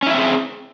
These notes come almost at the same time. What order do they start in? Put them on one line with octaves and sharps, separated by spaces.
C#4 E4 E5 C4 G#4